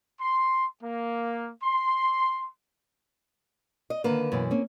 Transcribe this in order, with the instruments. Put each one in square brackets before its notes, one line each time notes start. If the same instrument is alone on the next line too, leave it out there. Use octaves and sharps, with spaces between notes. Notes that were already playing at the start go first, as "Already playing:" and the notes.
[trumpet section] C6
A#3
C6
[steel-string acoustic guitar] D#5
[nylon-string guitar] D3 D#3 [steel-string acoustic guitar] A#3 B4
[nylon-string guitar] F#2 B2 E3
A#3 C4 C#4